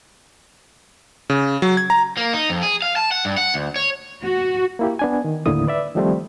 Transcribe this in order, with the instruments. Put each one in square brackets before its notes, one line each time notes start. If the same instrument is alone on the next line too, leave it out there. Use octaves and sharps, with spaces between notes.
[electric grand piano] C#3
F#3
G#6
A#5
[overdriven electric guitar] A#3
D#4
F2
G#4
F5
A5
F#5
G2
F#5
D2
C#5
[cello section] F#4
[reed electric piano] A#3 E4 G4
B3 D4 G#5
D#3
D#2 A2 D3 A#3 E4 D#6
B4 D5 E5
D#3 F3 G3 A3 C4